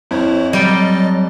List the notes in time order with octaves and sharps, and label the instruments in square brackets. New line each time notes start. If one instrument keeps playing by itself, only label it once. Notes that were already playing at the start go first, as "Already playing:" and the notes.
[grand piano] F2 [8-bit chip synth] E4 C5 C#5
[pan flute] F#3 [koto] G3 G5 [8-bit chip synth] D#5 A6